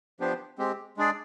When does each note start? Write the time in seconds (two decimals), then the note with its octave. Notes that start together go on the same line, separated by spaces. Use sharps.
0.20 F3 B3 D4 G4 C5
0.58 G#3 C4 G4
0.97 G#3 D4 G#4 D5